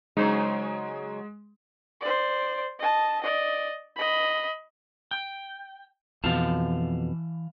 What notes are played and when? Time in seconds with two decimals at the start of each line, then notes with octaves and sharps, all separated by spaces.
0.17 C#3 F#3 G#3 D#4 G#4 C5
2.01 C5 D5
2.79 D#5 A5
3.21 D5 D#5
3.96 D#5 B5
5.11 G5
6.24 F2 B2 E3 F5 A5